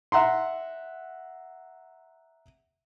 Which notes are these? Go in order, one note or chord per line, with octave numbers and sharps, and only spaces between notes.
E5 F#5 A#5 C6